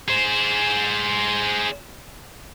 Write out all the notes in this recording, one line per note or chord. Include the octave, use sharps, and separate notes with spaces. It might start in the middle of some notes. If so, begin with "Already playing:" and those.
G#4 C5